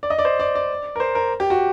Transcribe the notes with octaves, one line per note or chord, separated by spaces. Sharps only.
D5
D#5
D5
C5
D5
D5
A#4
C5
A#4
G4
F#4